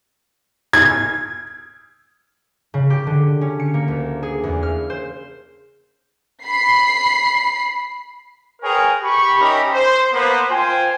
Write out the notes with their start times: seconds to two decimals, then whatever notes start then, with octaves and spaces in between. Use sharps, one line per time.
0.73 G#6
2.74 C#3
2.90 G4
3.07 D3
3.41 C#4
3.60 C#7
3.74 A#3
3.88 D2
4.23 G#4
4.43 E2
4.63 F6
4.90 C5
6.46 B5 C7
8.62 G#4 A#4 B4 C#5 G5 G#5
9.03 G4 B5 C#6
9.40 C#4 D#4 G4 A#4 E5 B5
9.72 C5
10.13 A#3 B3 B4 C5
10.50 F4 C5 G5 G#5